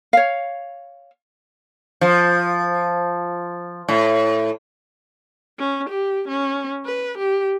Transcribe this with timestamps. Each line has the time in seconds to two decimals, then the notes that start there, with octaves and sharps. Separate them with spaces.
0.13 C#5 F5
2.01 F3
3.88 A2
5.58 C#4
5.89 G4
6.28 C#4
6.86 B4
7.18 G4